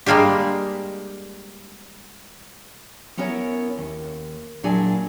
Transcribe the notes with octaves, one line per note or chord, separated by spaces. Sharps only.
G3 G#3 A#3 D4 G4
B3 C#4 E4 A#4 C#5
D#2
A#2 F#3 D4 E4 G#4 G#5